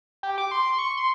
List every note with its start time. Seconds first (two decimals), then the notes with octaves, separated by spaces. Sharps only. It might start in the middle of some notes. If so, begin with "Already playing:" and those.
0.23 G4
0.38 D6
0.51 C6
0.79 C#6
0.97 C6